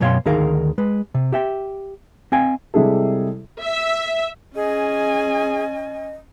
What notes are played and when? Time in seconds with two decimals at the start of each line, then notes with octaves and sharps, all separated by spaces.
0.01 F#2 B2 C#5 F5 G5 C6
0.26 D2 D#3 D#4 G#4 A#4 F5
0.78 G#3 B4
1.14 C3
1.32 G4 E5 G5
2.32 C4 D#5 F5 G5 G#5
2.74 C3 G3 G#3 E4 G#4 A4
3.61 E5
4.56 C#4 G#4 D#5 G#5